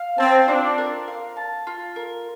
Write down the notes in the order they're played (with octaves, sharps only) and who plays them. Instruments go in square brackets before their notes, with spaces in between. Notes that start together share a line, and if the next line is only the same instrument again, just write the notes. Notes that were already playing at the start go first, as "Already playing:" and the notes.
Already playing: [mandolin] F5
[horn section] C4 [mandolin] A5
[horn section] D4 [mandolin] F4
[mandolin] A#4
F5
A5
F4
A#4